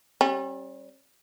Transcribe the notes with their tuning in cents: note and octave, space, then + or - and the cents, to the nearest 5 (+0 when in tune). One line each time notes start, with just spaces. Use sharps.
G3 -15 C#4 -40